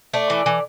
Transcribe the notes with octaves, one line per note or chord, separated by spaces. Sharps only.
A3 D5
E3
E3